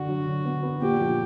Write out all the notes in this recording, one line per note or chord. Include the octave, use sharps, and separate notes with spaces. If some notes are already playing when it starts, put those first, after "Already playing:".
Already playing: D3 D4 F#4
F#3
D3
B3
B3
A#2 G4
F3